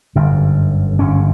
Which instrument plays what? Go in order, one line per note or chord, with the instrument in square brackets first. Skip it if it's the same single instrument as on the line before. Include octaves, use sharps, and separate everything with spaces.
[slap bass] G1 F#2 D3
G1 F#2 D3 C#4